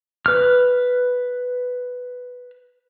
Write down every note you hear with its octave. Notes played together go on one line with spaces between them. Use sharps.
B4 F6